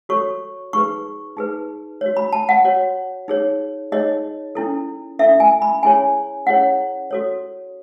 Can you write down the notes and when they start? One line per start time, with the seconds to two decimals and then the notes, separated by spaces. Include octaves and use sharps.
0.09 F#4 A4 C#5 C#6
0.73 D#4 G#4 B4 C#6
1.37 D#4 G#4 B4
2.01 F#4 C#5
2.17 B5
2.33 A5
2.49 F#5
2.64 F#4 C#5
3.28 D#4 G#4 C#5
3.92 D#4 G#4 C#5 D#5
4.55 C#4 E4 A4
5.19 C#4 E4 A4 E5
5.40 G#5
5.62 B5
5.83 C#4 E4 G#4 C#5 G#5
6.46 C#4 E4 G#4 C#5 F#5
7.11 F#4 A4 C#5